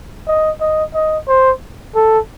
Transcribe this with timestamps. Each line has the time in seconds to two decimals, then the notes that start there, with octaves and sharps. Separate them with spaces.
0.27 D#5
0.60 D#5
0.94 D#5
1.27 C5
1.95 A4